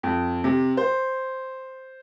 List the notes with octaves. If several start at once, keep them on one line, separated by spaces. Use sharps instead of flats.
F2
C3
C5